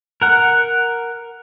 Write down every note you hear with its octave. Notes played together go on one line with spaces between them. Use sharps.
A#4 F#5